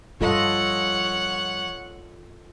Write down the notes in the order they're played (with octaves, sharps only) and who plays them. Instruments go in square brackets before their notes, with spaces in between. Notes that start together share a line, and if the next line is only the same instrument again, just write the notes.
[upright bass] G2 F3 [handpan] F4 A4 D#5 [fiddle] C#5 F#5